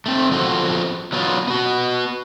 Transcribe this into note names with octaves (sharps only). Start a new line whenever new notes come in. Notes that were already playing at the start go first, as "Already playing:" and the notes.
A3 C4
F3 B3 C4 F4 F#4 A4
F#3 B3 F4
B3 F#4